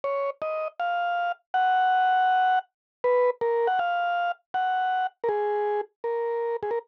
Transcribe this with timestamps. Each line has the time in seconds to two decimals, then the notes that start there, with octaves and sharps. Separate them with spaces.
0.04 C#5
0.42 D#5
0.80 F5
1.54 F#5
3.04 B4
3.41 A#4
3.67 F#5
3.79 F5
4.54 F#5
5.24 A#4
5.29 G#4
6.04 A#4
6.63 G#4
6.71 A#4